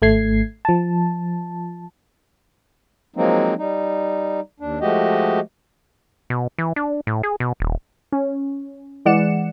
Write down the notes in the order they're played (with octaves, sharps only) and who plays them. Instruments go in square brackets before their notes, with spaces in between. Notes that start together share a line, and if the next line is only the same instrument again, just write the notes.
[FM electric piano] G#1 A3 G#6 C7
F3 A5
[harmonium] F3 F#3 G#3 A#3 C4 D#4
G3 D#4
D#2 D4
F3 G#3 A3 F#4 G4 D#5
[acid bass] B2
E3
D4
A2
G#4
B2
D#1
[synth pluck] C#4
E3 G#3 D5 F#5 C#7 E7